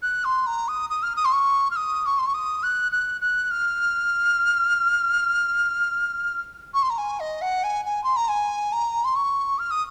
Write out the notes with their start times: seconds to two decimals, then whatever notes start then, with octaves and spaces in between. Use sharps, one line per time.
0.02 F#6
0.24 C6
0.46 A#5
0.68 D#6
0.90 D#6
1.03 F6
1.16 D#6
1.25 C6
1.32 C#6
1.71 F6
1.76 D#6
2.06 C#6
2.18 C6
2.26 C#6
2.34 D#6
2.63 F#6
2.92 F#6
3.21 F#6
3.51 F6
6.74 C#6
6.82 C6
6.90 A#5
6.98 G#5
7.20 D#5
7.41 F#5
7.63 G#5
7.85 G#5
8.04 C6
8.16 A#5
8.28 G#5
8.72 A#5
9.04 C6
9.15 C#6
9.58 F6
9.70 D#6